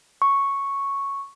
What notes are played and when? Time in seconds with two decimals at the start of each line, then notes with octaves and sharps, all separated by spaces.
0.22 C#6